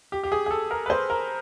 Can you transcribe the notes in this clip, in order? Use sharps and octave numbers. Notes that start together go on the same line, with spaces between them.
G4
G4
G#4
G#4
A4
A#4
B4
C5
A#4